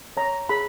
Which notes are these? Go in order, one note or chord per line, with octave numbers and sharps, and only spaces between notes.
C#5 A#5
G#4 B5